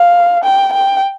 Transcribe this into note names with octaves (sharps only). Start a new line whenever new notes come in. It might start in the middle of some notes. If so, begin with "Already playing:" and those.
Already playing: F5
G5
G5